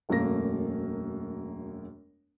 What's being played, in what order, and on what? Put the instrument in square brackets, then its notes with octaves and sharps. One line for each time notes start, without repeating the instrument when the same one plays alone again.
[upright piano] E1 F#2 A3 A#3 A#6